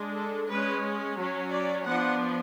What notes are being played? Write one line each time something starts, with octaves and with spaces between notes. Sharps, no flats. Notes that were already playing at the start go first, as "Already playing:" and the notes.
Already playing: G#3 D4
A4
G#3 C#4 B4
F#3 C#4
D5
F3 B3 D4 F#5